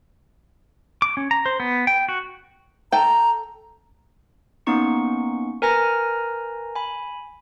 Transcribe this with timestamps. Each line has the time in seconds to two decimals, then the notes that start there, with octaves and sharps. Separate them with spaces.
1.02 D6
1.17 C#4
1.31 A#5
1.46 C5
1.60 B3
1.87 G5
2.09 F#4
2.92 A4 G5 A#5
4.66 A#3 B3 C#4 D#4 C#6 C#7
5.62 A#4 B4 G#5 A#5 F6 A#6
6.76 G#5 B5